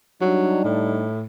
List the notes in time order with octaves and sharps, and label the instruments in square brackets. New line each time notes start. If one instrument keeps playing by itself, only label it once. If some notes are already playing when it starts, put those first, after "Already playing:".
[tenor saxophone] F#3 [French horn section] G3 D4 D#4
[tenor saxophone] A2